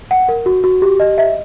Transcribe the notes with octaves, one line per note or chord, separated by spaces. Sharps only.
F#5
A#4
F#4
F#4
G4
D#5
E5